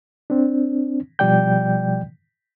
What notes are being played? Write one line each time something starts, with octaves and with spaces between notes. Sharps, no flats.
C4 D4
B2 F3 G3 D5 G5 G6